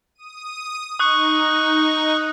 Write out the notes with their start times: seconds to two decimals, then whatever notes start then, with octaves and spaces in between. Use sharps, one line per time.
0.15 D#6 D#7
0.99 D#4 C#6 D#6 F#6